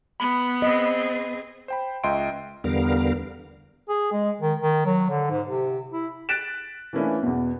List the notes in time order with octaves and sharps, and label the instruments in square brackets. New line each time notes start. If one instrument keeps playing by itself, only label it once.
[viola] B3 [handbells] B5
[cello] C4 G#4 [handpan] D#5
[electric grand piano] C5 G5 B5
C#2 D#5 E5 G5 C6 D7
[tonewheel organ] E2 D3 G3 B3 A#4 F5
[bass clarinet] G#4
G#3
D#3
D#3
F#3
D3
G#2
C3
E4
[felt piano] F#6 A6 B6 D7 E7
E3 A3 A#3 C#4 D4 E4
E2 B2